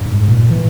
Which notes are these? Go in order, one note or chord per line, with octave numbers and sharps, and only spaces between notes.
G2
G#2
A#2
E3